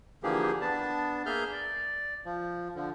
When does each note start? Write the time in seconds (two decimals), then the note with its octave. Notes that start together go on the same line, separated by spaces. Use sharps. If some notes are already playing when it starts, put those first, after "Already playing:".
0.23 D3 E3 F3 A#3 G4 G#4
0.61 B3 D4 A5
1.26 A#3 G#4 E5 F6 G6
1.52 D5
2.25 F3
2.75 D3 F3